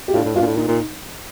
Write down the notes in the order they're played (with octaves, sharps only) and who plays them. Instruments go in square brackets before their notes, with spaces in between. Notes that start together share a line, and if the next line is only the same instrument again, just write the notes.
[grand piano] G4
[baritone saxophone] A2 [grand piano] D4 F4
[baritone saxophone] A2
[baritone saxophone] G2 [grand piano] D4 F4
[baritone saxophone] A#2
A2
[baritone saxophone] A#2 [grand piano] D#4
[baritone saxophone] A#2